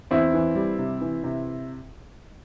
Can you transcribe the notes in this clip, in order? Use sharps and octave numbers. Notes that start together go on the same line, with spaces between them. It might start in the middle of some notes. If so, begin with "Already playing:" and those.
E2 C4 E4
E3
G3
C3
E3
C3